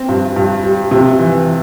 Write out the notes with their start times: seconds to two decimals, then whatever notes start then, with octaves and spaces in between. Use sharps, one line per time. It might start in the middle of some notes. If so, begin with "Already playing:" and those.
Already playing: C4
0.09 G2
0.36 G2
0.63 G3
0.91 C3
1.19 E3